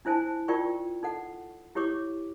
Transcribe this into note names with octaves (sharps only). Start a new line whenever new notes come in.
D4 E4 C5 G#5 A5
D#4 F4 A#4 D5 G5 C#6
D#4 A4 F#5
E4 G4 C#5 C#6 D6